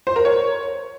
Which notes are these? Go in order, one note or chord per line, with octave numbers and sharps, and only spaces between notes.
C5
A#4
C#5